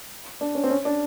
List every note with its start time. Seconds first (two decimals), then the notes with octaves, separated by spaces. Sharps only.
0.41 D4
0.55 C#4
0.64 C4
0.70 C#4
0.85 D4